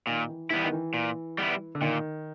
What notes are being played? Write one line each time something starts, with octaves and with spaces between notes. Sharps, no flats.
A#2 D#3
E3
E3 G3 B3 E4
D#3
E3
A#2
G3 B3 E4
D3
A#2 D#3